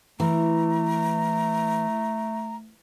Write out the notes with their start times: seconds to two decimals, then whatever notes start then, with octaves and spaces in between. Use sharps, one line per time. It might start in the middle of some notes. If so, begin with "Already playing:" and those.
0.20 E3 A3 A#5